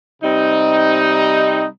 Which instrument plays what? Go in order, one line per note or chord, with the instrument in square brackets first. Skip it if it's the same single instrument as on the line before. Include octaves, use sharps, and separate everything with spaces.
[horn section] C3 G3 C4 D#4